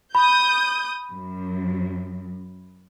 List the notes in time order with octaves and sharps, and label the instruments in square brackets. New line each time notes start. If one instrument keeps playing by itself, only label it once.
[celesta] B5 [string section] D#6 G6
[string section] F#2